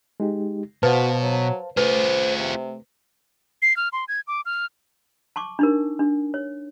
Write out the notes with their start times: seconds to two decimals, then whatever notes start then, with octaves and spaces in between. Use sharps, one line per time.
0.20 G#3 D#4 G4
0.83 B2 F#4 B4 C5 F5 A5
1.20 F#3
1.77 A3 F4 G#4 B4 C5
2.37 C3
3.62 C7
3.77 F6
3.93 C6
4.08 G#6
4.27 D6
4.46 F6
5.36 A5 C#6 D6
5.59 D4 D#4 A#4
5.99 D4
6.34 C#5